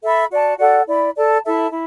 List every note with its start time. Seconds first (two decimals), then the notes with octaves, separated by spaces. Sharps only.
0.02 A4 E5 B5
0.31 F#4 D5 A5
0.58 F#4 A4 D5 F#5
0.87 E4 D5 B5
1.15 A4 D5 A5
1.44 E4 A4 E5 A5
1.71 E4